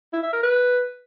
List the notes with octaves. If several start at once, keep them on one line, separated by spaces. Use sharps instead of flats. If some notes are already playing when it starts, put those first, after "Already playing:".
E4
E5
A#4
B4